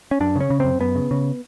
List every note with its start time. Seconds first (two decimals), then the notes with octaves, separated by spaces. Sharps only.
0.11 C#4
0.20 F#2 D4
0.36 C#3 C#4
0.50 C#3
0.60 F#2 C4
0.80 F#2 B3
0.95 C#3
1.11 C#3